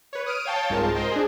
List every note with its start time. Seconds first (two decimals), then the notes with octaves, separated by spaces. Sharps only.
0.13 B4 C#5
0.26 D#6 F6 D7 D#7
0.45 C#5 F5 G5 A5
0.70 C2 G#2 G#3 F4 A#4 A5
0.95 A#4 C5 D#5 G5
1.12 D4 G#4